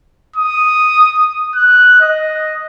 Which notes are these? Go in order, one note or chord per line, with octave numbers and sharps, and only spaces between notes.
D#6
F#6
D#5